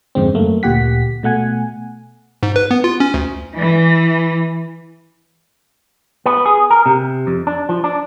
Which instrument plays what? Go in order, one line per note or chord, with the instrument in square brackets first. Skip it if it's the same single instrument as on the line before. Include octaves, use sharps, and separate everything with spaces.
[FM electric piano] F2 G#2 D3 G#3 C4
F#2 A3 A#3
D2 A#2 G4 F#5 B6
B2 A3 F#5 G#5
[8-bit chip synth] G#2
B4
B3
F4
C#4
D2
[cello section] E3
[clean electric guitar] B3
G#4
A#4
C3
F2
D4
F3
D4